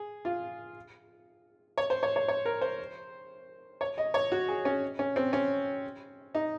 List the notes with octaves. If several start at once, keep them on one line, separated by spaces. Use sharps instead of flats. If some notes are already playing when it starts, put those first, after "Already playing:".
Already playing: G#4
F4
C#5
C5
C#5
C#5
C#5
A#4
C5
C#5
D#5
C#5
F#4
G#4
C#4
C#4
C4
C#4
D#4